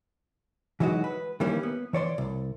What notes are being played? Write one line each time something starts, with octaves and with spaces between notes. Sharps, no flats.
E3 F#3 G#3 D#4 F#4
B4
D#3 E3 G3 A#3 C#4
B3
E3 C#5 D5 C6
C2